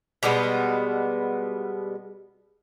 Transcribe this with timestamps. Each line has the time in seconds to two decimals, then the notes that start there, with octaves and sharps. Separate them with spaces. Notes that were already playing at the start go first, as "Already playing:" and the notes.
0.23 B2 G3 G#3 B3